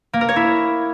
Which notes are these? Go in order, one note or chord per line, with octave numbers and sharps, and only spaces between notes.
A#3
A#4
C#5
E4